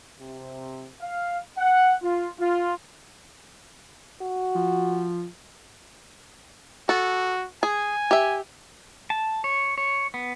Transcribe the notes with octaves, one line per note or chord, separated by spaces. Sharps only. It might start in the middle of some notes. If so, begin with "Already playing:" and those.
C3
F5
F#5
F4
F4
F#4
F3
F#4 A4
G#4 G#5
G4 E5
A5
C#5
C#5
B3